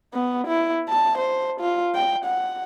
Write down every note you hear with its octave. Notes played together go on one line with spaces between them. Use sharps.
B3
E4
A5
C5
F4
G5
F#5